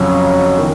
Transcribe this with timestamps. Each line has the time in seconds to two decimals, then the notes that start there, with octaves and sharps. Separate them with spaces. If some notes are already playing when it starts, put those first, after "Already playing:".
Already playing: F2 C#3 F#3 C#4
0.58 D#3